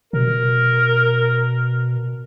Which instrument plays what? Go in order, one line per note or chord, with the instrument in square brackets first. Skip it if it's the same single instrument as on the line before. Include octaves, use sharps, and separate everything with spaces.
[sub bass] B2 [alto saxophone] A#4